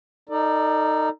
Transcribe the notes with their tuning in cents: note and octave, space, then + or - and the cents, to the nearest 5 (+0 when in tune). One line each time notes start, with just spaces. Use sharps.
D#4 +0 A4 +35 D5 +20